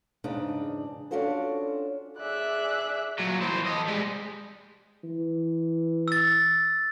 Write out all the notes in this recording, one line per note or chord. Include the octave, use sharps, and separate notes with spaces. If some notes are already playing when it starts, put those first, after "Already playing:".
E2 G#2 C#3 D4 D#4
C#4 D4 F4 F#4 A4 C5
G#4 D5 E5 F#6
A#2 F#3
E3 C5
A4 D#5
G3 G#3
E3
E6 A6